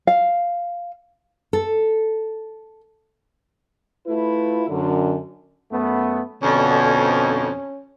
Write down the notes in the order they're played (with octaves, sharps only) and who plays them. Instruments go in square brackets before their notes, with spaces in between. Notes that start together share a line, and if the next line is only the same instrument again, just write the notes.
[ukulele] F5
[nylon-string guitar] A4
[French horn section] A3 E4 F4 B4
F#2 D3
[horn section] F#2 A3 B3
[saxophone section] F2 [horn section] B2 D3 [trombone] C#4